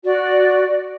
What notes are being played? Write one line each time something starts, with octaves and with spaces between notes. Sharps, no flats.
F#4 D5